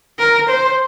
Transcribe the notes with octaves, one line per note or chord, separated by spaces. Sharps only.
A#4
C5